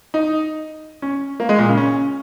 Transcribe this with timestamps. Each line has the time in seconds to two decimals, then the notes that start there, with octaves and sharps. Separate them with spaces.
0.14 D#4
1.02 C#4
1.40 A#3
1.49 G#3
1.58 A#2
1.69 C#3
1.77 C#4